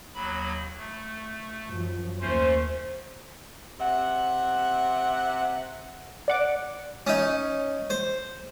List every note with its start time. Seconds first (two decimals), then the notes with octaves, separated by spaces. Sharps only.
0.14 D#2 F#3 B5
0.78 A3
1.68 F#2 F3
2.20 D#2 A3 C#4 C5
3.79 C3 E5 F#5
6.28 D5 F#5 D6
7.07 C#4 D#4
7.90 C5